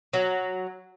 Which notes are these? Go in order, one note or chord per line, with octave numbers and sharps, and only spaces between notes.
F#3